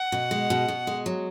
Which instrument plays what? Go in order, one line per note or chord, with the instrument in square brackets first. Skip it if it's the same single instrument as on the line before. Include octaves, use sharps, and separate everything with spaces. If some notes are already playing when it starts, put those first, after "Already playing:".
Already playing: [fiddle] F#5
[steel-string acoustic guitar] B2
G#3
B2
B2
G#3
F#3